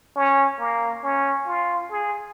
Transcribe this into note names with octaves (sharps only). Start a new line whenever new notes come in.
C#4
A#3
C#4
F4
G#4